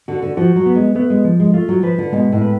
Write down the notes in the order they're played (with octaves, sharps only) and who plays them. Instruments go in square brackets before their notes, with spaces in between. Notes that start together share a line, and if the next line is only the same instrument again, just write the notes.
[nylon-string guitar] D3 [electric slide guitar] F#4
[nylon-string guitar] D3
[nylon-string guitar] F3 [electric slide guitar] F#4
[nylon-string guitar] F#3
[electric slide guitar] B3
[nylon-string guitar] G#3
[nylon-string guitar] A3 [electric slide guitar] B3
[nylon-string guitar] G#3
[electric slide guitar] F3
[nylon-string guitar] G#3
[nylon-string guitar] A3 [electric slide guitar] F4
[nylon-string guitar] F#3
[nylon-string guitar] F3 [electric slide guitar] B4
[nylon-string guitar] D3
[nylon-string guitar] B2 [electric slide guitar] G#3
[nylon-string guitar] A2
[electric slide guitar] B4